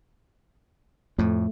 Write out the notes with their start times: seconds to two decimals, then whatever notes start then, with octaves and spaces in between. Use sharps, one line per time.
1.19 F2 A2 A3